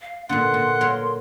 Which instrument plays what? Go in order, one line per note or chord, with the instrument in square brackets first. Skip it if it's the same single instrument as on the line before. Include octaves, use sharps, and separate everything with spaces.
[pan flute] F5
[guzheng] A#2 D3 [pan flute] A#3 [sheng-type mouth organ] F#5 [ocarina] C6
[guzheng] A#2
F#3 A#4